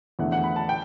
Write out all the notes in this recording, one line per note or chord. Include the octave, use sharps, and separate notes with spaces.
E2 D3 A3 F#5
F#5
B5
A5
G5